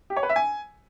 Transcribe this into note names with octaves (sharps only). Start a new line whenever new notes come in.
G4
C#5
B4
E5
G#5